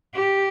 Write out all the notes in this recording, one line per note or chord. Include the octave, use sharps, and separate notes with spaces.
G4